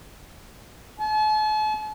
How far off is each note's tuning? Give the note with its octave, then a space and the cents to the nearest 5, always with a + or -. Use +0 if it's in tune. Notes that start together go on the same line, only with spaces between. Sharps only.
A5 -45